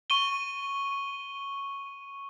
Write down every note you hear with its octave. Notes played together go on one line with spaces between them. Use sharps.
C#6 D#7 G7